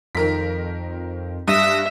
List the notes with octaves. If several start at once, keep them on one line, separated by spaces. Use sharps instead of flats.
F2 D#3 A#4 B6
G2 E5 D#6 A#6